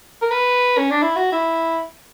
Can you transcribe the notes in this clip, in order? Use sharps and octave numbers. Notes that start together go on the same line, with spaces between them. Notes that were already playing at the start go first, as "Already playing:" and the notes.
A#4
B4
C#4
D4
E4
F#4
E4